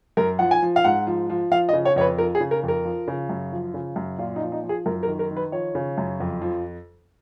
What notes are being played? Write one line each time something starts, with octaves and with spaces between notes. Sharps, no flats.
F#2 A#4
F3 F#5
G#5
F3
F5
G#2 F#5
F3
F3
F3 F5
D#5
C#3
C#5
F2 B4 C#5
F3 A#4
G#4
C#3
A#4
F2 A#4
F3
C#3
F#2
F3
C#3
F#2
A#2 F4
D#4
F3
D#4
F3
G#4
F#2 A#4
A#4
D#3
A#4
D#3
B4
F3 C#5
C#3
F#2
F2
F3